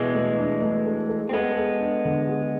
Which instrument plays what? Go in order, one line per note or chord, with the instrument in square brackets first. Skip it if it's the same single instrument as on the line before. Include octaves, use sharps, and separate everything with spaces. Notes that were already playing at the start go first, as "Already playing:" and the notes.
Already playing: [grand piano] B2 [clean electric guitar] E3 G#3
[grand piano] A3
D4
A3
A4
A4
[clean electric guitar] C4
[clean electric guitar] G#3 B3 [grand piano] A4
[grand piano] A4
D4
D3
G#4